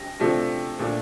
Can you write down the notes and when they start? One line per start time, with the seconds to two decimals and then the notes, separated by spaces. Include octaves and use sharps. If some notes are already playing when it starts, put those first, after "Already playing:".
Already playing: A#6
0.20 C3 F3 A3 D4
0.79 A#2 A3 D4